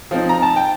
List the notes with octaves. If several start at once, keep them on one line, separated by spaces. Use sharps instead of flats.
F3 C4 D#4
A#5
A5
G5